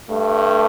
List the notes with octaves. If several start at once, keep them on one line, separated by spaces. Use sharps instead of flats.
G2 A3